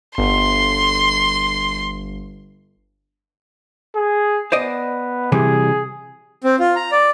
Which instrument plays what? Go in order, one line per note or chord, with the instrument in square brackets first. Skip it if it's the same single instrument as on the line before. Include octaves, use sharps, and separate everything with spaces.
[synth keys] G1 [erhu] C6
[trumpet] G#4
[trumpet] B3 [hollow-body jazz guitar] C5 D5 D#5
[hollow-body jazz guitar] C3 E3 G3 [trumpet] G#4
[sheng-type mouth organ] C4
F4
A#5
D5